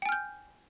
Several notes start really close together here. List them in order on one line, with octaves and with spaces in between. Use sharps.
G5 G#5 F6 G6